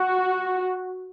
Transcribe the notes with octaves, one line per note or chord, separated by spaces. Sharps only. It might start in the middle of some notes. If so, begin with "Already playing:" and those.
Already playing: F#4